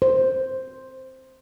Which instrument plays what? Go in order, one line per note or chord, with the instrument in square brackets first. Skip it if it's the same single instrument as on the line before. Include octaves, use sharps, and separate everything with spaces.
[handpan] C5